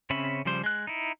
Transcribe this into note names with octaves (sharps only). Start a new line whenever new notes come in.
C#3 C4 C#4 E5 B5
C#3 F3 G3 C5
G#3 F#6
D#4 E4